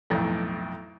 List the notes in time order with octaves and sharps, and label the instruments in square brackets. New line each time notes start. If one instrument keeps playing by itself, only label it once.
[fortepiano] B1 F2 A2